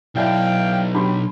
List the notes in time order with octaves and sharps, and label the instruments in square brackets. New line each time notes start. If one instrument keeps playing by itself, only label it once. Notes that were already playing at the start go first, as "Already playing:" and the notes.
[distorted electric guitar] B1 [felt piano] E4 D5 G#5 [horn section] F5 G5
[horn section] F#3 C#4 G4 [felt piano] D4 B5 C6